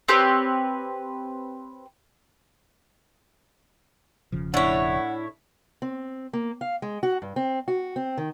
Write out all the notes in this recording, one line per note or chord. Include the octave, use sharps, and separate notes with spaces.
C4 G4 B4 C#5
E1 C#3 F3
A2 D4 E4 C#5 F#5
C4
A#3
F5
G#3
F#4
G2
C4
F#4
C4
D#3